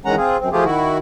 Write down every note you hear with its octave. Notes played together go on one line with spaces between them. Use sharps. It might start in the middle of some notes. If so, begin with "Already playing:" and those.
E2 D#3 G#3 C#4 F#5 A#5
C4 F4 G#4
F#2 C4
F3 A3 F4 G4 G#4
D#3 E4 F#4